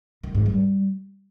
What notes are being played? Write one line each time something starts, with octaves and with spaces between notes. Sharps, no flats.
D#3
G#2
G3